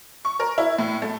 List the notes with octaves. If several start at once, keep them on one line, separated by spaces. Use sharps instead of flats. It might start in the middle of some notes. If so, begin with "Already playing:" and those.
C#6
A#4
E4
A2
A3